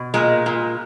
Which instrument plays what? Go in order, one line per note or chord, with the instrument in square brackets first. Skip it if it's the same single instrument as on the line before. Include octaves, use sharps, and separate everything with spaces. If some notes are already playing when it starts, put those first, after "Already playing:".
Already playing: [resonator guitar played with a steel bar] B2
A#2 G#3
A#2